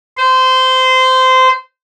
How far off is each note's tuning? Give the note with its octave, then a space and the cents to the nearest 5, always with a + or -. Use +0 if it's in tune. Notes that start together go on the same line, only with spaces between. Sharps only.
C5 -20